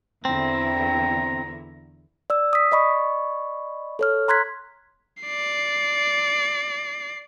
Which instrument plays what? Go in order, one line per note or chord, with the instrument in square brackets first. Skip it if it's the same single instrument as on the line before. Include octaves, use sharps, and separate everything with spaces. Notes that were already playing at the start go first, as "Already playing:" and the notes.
[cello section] E2 D3 E4 [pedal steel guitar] C4 [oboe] A#5
[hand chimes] D5 E6
D#6 B6
D5 D#5 B5 C#6
A4 C#5 F6
A#5 C6 F#6 G#6 B6
[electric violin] D5 C7